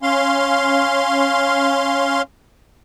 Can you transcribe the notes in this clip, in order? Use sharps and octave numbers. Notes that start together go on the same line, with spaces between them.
C#4 F5 C6